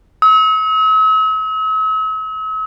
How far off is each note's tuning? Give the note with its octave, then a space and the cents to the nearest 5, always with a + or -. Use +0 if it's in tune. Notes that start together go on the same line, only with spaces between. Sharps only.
E6 -45